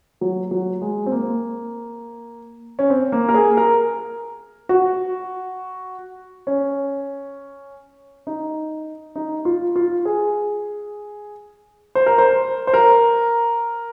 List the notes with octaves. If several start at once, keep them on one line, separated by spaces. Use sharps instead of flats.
F#3
F#3
G#3
C4
A#3
C#4
C4
A#3
A#4
G#4
A#4
F#4
C#4
D#4
D#4
F4
F4
G#4
C5
A#4
C5
C5
A#4